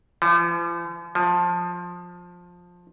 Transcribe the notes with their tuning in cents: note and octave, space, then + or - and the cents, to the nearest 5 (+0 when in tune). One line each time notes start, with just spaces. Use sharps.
F3 -45
F3 +15